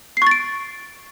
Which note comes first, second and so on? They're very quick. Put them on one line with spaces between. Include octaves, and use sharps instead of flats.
C7 C#6 A6 D7